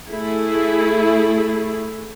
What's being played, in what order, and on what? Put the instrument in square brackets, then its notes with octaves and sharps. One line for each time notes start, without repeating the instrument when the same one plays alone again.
[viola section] A3 E4 G#4